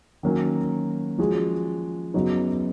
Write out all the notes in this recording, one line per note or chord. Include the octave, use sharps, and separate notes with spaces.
D#3 F#3 A#3 C#4
F3 G#3 C#4 F#4
F#2 C#3 F#3 B3 D#4